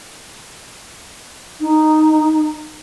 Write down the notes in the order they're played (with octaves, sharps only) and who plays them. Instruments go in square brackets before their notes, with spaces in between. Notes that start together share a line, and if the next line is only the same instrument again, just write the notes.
[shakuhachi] D#4